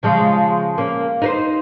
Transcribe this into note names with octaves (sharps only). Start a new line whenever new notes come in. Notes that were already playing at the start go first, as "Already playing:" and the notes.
C#3 F3 G#3
A#3 C#4
D#4 B4 C5